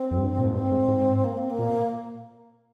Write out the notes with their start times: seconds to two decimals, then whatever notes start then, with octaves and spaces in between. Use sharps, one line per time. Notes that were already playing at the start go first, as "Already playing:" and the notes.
Already playing: C4
0.11 F2
0.17 G2
0.38 A#2
0.45 G#2
0.53 G2 C4
0.71 G#2
0.88 G#2
1.24 A#3
1.37 C4
1.50 A#3
1.59 A#2